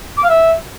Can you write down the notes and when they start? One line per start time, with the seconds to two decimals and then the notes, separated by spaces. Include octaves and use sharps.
0.18 D6
0.23 F5
0.29 E5